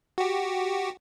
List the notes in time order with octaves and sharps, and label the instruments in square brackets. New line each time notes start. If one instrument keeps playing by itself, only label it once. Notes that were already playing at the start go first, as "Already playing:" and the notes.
[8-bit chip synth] F#4 G4